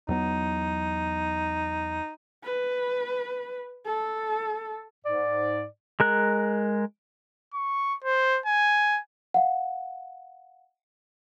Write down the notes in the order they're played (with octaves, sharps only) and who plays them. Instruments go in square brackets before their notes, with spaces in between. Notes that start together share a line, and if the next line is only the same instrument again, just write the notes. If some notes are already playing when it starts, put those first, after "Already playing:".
[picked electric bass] E2 F#3 B3 [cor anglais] D#4
[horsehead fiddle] B4
A4
[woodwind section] G#2 D5
[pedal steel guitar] G#3 A#4 F#6
[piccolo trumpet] C#6
C5
G#5
[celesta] F5 F#5